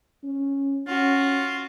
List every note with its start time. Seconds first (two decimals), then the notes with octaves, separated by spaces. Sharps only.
0.23 C#4
0.87 C#4 F4 F#4